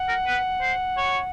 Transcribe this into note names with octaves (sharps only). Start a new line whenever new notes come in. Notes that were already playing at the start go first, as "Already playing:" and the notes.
Already playing: F#5
A#4
B4
C5
C#5